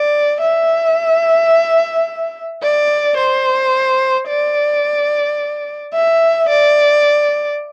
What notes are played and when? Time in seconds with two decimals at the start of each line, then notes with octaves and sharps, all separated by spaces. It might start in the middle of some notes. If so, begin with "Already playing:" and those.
Already playing: D5
0.42 E5
2.62 D5
3.18 C5
4.28 D5
5.94 E5
6.49 D5